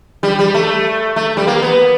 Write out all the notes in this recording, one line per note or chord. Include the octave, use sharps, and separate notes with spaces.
G3
G3
A3
A3
G3
A#3
B3